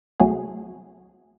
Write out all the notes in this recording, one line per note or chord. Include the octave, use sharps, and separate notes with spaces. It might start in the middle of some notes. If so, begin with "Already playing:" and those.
C2 F#3 A3 F#4 G#4